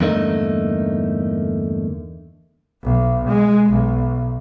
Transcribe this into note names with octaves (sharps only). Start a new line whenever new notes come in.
E2 G2 D3 A3 A#3 D#4
B1
G#3
B1